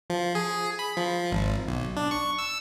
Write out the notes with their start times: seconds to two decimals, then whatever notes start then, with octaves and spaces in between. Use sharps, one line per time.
0.10 F3
0.35 G#4
0.79 B5
0.97 F3
1.32 G#1
1.68 B1
1.97 D4
2.11 C#6
2.39 E6